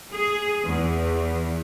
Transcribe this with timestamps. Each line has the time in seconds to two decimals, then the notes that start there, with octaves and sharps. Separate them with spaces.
0.13 G#4
0.64 E2